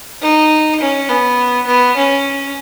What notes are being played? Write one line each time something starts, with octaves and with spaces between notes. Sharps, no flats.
D#4
C#4
B3
B3
C#4